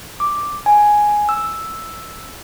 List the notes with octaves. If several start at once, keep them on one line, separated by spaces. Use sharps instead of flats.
D6
G#5
E6